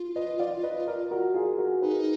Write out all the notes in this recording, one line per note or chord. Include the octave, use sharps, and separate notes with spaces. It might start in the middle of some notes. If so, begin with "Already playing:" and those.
Already playing: F4
B4 D#5
D5 F5
B4 D#5
A#4 D5
F#4 A#4
F4 G#4
F#4 A#4
D#4 G#4 B4